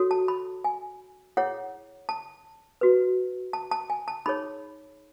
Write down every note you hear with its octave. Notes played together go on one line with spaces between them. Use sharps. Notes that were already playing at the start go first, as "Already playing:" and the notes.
Already playing: F#4 A4 C#5
A5
B5
G#5
E4 G#4 C#5 F#5
A5
F#4 B4
A5
A5
G#5
A5
D#4 G#4 C#5 B5